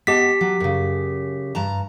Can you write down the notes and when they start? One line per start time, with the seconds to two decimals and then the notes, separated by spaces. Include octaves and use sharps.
0.07 B3 G4 D#5 A5 B6
0.41 F#3
0.60 F#2 C#3
1.55 G2 A5 A#5